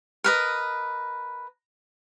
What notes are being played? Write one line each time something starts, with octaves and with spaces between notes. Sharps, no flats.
A#4 B4 D#5